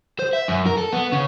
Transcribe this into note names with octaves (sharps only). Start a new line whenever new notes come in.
C5
E5
F#2
A#4
A4
B3
C#3